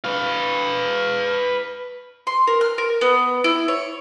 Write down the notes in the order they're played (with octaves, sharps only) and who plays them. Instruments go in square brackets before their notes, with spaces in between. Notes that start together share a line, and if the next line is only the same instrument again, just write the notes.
[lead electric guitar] B4 F5
[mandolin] C6
A#4
F6
A#4
B3
E4
C#5